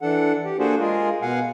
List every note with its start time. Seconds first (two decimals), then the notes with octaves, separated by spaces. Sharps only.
0.01 E3 D4 A4 F#5
0.45 G4
0.59 A#3 D4 F#4 G#4 A4 C5
0.80 G#3 F4 G#4 A#4
1.22 B2 F5 F#5 G#5